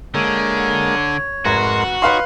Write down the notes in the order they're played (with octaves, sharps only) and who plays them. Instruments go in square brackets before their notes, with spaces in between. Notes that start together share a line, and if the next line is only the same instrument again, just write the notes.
[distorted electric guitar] D3 [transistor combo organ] G#3 A#3 [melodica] C#5
[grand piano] F1 B4 [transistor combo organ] G#2 A#4 C6 [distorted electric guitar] F#4
[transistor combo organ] D#4 C#5 [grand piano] B4 F5 C6